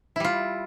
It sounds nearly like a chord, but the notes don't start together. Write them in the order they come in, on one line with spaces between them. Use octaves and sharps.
E4 G3 F4